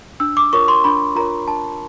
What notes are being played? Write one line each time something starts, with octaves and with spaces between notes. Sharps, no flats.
D4 E6
D6
F4 A#4 C#5 C#6
C6
D4 B5
F4 A#4 C#5 A#5
D4 A5